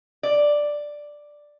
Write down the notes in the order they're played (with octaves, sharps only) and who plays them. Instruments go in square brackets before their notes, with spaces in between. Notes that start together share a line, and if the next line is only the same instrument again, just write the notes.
[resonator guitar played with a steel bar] D5